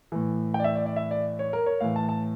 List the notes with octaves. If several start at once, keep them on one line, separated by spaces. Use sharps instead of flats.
A2 E3
G5
D5
E5
D5
D5
E5
D5
C#5
A#4
C#5
A2 E3 F5
A5
A5